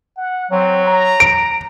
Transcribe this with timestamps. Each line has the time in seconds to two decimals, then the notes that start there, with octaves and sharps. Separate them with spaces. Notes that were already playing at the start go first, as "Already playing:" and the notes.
0.17 F#5
0.51 F#3 C4
0.86 A#5
1.20 D7